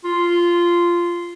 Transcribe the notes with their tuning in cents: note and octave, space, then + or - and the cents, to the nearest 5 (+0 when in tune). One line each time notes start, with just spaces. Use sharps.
F4 -10